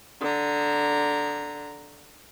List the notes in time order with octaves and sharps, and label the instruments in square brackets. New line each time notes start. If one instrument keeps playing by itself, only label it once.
[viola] D3 A#5